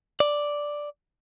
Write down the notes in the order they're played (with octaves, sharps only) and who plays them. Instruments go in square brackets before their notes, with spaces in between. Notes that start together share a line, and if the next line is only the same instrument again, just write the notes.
[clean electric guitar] D5